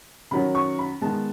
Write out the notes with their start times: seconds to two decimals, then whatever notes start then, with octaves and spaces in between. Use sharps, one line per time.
0.31 D#3 F#3 C#4 B5
0.55 C#6
0.79 B5
1.01 D#3 G#3 B3 A5